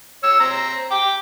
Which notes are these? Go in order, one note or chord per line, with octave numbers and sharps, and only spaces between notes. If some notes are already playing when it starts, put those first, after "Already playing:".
C#5 E6
C4 A#5
G5 D6